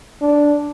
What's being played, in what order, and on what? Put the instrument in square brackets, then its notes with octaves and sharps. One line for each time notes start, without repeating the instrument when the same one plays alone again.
[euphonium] D4